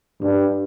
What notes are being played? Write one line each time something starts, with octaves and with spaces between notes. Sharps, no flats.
G2